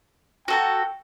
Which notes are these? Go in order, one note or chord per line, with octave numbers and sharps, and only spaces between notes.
F#4 A4 G5 A#5